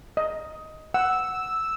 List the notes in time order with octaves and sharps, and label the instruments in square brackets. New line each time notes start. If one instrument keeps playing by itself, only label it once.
[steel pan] D#5
[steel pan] F#5 [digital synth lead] E6